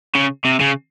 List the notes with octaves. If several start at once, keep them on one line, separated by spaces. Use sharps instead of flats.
C#3
C3
C#3